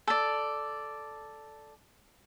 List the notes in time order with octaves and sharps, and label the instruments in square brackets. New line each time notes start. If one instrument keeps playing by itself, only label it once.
[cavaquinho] A4 D5